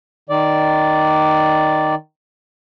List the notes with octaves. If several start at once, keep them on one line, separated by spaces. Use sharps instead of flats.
D#3 D5